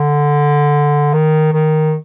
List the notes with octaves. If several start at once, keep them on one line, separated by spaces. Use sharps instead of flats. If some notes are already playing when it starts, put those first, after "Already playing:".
Already playing: D3
D#3
D#3